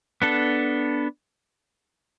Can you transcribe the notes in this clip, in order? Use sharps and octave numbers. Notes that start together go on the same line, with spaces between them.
B3 D4 A4